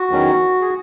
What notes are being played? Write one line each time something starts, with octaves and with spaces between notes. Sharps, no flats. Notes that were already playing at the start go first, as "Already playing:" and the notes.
Already playing: F#4
E2 D#3 F#3 C#4
G#4